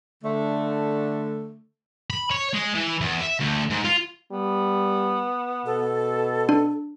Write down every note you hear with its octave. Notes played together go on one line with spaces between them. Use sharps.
D3 A3
B5
C#5
G#3
E3
E2
E5
D2
G#2
F4
G3 B3
B2 A4
D4